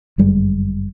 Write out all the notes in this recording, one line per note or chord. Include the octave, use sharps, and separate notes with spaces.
G1 F#2 G3 G#3